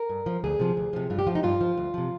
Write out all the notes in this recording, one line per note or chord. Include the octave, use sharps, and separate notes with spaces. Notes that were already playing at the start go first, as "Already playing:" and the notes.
Already playing: A#4
G2
F3
D2 G#4
C3 F3
D2
C3 F3
G2 F4
G4
F3 F4
D#4
G2 F4
F3
D2
C3 F3